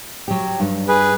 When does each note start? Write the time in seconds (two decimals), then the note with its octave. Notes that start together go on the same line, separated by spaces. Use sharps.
0.28 F#3 G4
0.60 G2
0.88 G#4 B4